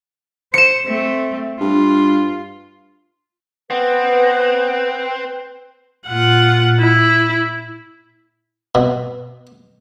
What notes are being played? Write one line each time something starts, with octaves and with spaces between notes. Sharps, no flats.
C5 C#7 E7
A3 C4
G2 F4
B3 C4 B4
A#2 F4 F#5
E4
B2